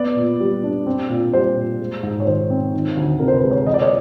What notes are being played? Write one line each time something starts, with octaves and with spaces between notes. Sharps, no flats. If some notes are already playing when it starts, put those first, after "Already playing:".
Already playing: B3 D5
A#2
G3
D4
C4
A#2
G3 C5
A#2
G#3
G#2
C#5
D#3 C5
C4
D#3
D2
C3 A#4
C5
B4
G#3
C#5
E3 D#5
D5
C#5